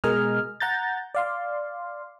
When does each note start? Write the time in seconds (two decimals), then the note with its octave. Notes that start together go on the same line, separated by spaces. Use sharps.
0.04 B2 G#3 A#4 D#5 G#5 F6
0.60 F#5 A#5 G6 A6
1.15 D5 F5 C6